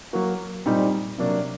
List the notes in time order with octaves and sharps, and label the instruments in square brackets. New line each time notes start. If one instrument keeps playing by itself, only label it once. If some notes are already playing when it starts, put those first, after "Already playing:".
[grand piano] F#3 A#3 F#4
A#2 G3 C4 D#4
C3 F#3 A#3 D4